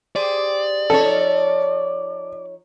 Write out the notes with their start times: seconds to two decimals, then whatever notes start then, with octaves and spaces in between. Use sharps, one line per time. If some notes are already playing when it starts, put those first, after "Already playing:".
0.16 G4 G#4 C5 D5
0.90 F3 D#4 A4 C#5